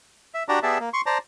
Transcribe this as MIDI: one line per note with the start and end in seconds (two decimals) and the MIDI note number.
0.34 0.43 76
0.49 0.59 62
0.49 0.59 66
0.49 0.59 67
0.49 0.59 74
0.49 0.59 81
0.49 0.59 82
0.63 0.78 59
0.63 0.78 67
0.63 0.78 68
0.63 0.78 74
0.63 0.78 76
0.63 0.78 81
0.80 0.89 58
0.93 1.01 84
0.93 1.01 85
1.06 1.18 72
1.06 1.18 74
1.06 1.18 81
1.06 1.18 82